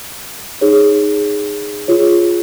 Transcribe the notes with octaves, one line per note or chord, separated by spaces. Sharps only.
D#4 G#4 C#5
F4 G#4 C#5